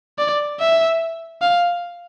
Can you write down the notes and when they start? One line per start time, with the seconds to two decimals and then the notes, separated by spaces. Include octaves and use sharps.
0.18 D5
0.60 E5
1.42 F5